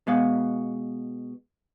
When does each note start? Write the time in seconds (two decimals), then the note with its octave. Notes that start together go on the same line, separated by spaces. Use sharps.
0.07 B2 G#3 B3 F5